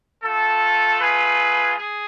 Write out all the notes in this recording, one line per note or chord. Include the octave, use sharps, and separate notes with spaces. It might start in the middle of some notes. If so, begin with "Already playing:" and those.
A3 F4 A4
G#4 B4
G#4